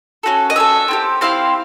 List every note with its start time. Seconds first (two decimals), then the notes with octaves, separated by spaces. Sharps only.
0.23 C#4 F#4 A4
0.50 D#5
0.56 C#4 F#4 A4 E5
0.88 C4 E4 G4
1.21 C4 E4 G4 F5